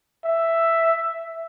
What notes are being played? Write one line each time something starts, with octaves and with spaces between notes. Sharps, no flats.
E5